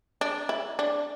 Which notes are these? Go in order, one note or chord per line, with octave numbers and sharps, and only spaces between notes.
D4
E4
D4